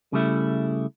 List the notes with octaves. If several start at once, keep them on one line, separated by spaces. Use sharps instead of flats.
C#3 G3 A3 E4